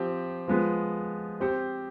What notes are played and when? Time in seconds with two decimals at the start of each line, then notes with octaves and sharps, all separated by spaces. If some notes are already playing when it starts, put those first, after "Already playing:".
Already playing: F3 C4 G4
0.48 F3 G#3 B3
1.40 C4 G4 C5